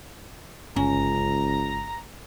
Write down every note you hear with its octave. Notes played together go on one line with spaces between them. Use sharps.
G1 C#2 C#4 A#5